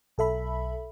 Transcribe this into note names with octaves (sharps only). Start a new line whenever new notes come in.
B1 A4 E5 B5